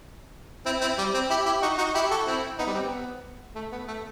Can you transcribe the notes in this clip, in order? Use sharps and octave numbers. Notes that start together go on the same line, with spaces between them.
C4 E4
C4 E4
G3
C4
E4 G4
E4 G4
D#4 F#4
D#4 F#4
E4 G4
F#4 A4
C4 E4
B3 D#4
G3
C4
B3
A3
B3
A3